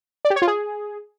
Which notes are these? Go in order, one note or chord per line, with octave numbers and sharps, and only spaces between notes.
D5
G4
C#5
F4
G#4